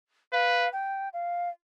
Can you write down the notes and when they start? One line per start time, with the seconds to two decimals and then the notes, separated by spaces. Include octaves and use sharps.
0.33 B4 F5
0.73 G5
1.13 F5